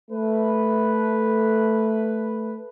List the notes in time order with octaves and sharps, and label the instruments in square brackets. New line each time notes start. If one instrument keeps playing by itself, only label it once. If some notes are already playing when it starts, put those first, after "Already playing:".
[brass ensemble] A3 B4